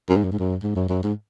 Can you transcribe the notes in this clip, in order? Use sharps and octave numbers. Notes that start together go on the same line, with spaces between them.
F#2
G#2
F#2
G#2
F#2
G#2
F#2
F#2
G#2